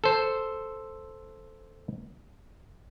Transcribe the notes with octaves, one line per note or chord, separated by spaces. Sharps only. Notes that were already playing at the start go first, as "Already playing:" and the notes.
A4 C5